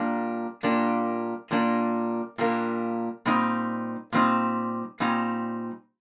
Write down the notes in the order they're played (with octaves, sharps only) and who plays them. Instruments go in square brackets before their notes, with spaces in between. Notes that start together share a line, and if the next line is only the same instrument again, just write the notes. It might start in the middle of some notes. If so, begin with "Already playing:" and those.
Already playing: [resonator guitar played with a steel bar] A#2 G3 A#3 D4
A#2 G3 A#3 D4
A#2 G3 A#3 D4
A#2 G3 A#3 D4
A#2 G3 C4 D#4
A#2 G3 C4 D#4
A#2 G3 C4 D#4